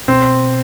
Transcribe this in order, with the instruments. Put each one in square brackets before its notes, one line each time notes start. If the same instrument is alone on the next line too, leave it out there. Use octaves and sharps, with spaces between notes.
[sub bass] B2 [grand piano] C4